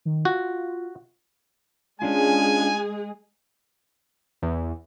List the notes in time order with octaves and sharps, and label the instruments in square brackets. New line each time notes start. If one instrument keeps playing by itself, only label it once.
[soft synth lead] D#3
[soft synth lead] F4 [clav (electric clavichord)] F#4
[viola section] G#3 G#4 [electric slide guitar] C#4 D4 F4 [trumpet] G#5
[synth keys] E2